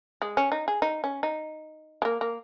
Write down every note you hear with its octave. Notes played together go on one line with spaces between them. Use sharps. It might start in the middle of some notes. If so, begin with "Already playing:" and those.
G#3
C#4
D#4
G#4
D#4
C#4
D#4
G#3
A#3
A#3